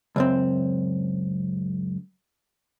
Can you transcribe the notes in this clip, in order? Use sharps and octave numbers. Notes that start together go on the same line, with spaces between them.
C#2 F#2 C4